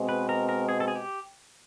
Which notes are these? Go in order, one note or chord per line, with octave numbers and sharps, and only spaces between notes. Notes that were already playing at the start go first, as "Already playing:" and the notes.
Already playing: B2 G#3 C4
B4
A#4
A#4
G#4
A4
G#4
G4